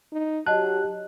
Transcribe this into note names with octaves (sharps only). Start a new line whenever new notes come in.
D#4
F#3 G4 D#5 F#5 A5 F#6